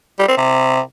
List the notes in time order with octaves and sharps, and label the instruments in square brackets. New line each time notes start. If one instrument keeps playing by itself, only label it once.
[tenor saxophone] G3
C4
C3